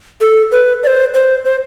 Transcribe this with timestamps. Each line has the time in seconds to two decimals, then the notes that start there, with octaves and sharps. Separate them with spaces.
0.21 A4
0.52 B4
0.83 D5
0.87 C5
1.14 C5
1.45 C5